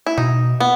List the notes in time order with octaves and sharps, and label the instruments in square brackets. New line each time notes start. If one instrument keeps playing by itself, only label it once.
[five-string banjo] E4
[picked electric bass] B2 [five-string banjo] D#4
[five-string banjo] B3